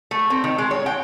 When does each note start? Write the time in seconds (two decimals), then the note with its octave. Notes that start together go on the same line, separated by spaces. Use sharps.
0.11 A3
0.30 C4
0.44 D#3
0.58 G#3
0.71 C#5
0.86 G5